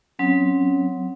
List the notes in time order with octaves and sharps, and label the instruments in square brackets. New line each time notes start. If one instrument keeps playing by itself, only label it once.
[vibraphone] F#3 C4 [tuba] C#4